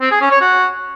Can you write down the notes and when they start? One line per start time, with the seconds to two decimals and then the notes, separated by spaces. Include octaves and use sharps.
0.01 C4
0.11 G#4
0.21 C#4
0.31 C#5
0.41 F#4